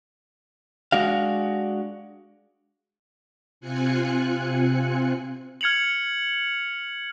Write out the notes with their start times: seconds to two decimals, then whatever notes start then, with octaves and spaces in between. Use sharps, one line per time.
0.92 G#3 D4 F#4 F5
3.61 C3 C4 F4 G#5 F#6 C#7
5.61 F6 G#6 C#7 F7 F#7